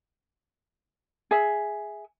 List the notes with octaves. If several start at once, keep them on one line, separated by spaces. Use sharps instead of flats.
G#4 E5